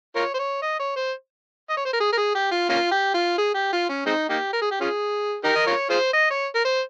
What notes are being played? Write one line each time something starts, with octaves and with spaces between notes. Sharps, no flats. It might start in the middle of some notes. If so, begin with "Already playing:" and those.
F4 A#4 C#5
C5
C#5
D#5
C#5
C5
D#5
C#5
C5
A#4
G#4
A#4
G#4
G4
F4
A#3 C#4 F4
G4
F4
G#4
G4
F4
C#4
G#3 C4 D#4
A#3 D#4 G4
A#4
G#4
G4
C#4 F4 G#4
D#4 G4 A#4
D#5
F4 A#4 C#5
F4 G#4 C5
D#5
C#5
A#4
C5